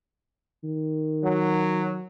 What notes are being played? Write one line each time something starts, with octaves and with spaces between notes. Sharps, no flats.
D#3
F#3